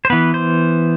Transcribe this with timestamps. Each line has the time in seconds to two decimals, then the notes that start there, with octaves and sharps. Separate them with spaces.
0.05 C5
0.10 E3 B3 B4
0.34 C5